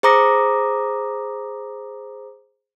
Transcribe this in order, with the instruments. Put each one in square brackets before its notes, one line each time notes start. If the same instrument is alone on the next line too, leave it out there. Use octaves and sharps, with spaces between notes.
[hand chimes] G#4 C5 A#5 D6 D#6 A#6